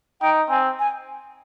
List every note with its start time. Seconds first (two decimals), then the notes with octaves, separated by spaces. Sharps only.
0.21 D#4 G5
0.50 C4 G#5
0.79 G#5